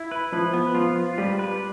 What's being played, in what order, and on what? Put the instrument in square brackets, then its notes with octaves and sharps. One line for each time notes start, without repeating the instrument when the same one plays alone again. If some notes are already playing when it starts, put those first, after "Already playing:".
Already playing: [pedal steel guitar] E4
B4
[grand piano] F3 [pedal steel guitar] B4
[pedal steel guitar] B3
[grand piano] F3 [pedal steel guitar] F4
[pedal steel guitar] F4
[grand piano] G3 [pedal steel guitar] B4
[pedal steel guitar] B4